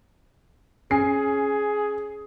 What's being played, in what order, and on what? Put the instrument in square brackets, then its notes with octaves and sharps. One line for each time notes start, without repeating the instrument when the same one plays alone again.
[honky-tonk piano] C#4 C7 [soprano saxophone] G#4